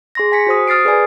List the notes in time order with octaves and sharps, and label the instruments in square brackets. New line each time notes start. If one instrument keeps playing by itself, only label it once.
[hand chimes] G#4 C6 A#6
G#5 B6 C#7
F#4 C5 D#6
D#6 F6 A6 C7 D7
G#4 B4 D5 G#5